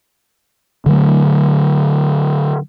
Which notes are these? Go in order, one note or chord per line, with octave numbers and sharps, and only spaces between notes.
D3 F#3 A3